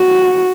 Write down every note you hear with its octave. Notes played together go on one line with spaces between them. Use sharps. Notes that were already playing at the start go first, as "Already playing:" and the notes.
Already playing: F#4